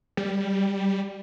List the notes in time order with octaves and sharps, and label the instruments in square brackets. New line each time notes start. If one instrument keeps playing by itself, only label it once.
[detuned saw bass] G3